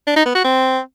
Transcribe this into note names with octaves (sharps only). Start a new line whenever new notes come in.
D4
D#4
B3
F#4
C4